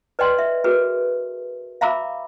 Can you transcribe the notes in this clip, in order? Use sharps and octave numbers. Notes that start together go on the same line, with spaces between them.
B4 D5 D#5 G5 C6
E5
F#4 G#4 A#4 B4
E5 F5 A#5 B5 D6 E6